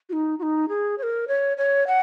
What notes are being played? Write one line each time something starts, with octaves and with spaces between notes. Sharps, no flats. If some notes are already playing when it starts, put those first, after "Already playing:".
F#4
D#4
F#4
D#4
G#4
C#5
A#4
C#5
C#5
F#5